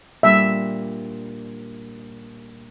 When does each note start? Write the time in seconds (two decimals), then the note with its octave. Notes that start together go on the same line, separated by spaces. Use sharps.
0.23 A#2 G3 D4 E5